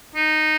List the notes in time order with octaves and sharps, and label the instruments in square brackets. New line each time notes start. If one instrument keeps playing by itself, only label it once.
[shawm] D#4